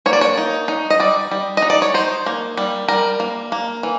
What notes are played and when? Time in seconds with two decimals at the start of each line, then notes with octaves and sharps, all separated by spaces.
0.06 A#3 C#5
0.13 D5
0.21 C#5
0.37 D#4
0.68 D#4
0.90 D#5
1.00 G3 D5
1.31 G3
1.57 D#5
1.62 D#4
1.70 D5
1.82 C#5
1.94 D#4 C5
2.26 A#3
2.57 G3
2.88 G3 A#4
3.20 A#3
3.52 A#3
3.83 E3